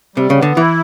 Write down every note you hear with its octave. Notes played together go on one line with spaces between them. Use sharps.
C3 G3
C#3
B3
D3
E3 E4